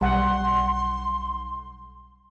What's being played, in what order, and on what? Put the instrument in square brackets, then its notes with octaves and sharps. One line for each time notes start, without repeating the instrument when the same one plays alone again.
[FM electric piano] B1 [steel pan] G3 F#5 [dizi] C6